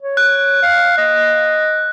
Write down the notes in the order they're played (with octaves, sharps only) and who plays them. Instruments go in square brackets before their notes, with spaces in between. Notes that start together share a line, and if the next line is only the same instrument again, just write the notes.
[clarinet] C#5
[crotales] F#6
[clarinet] F5
D#5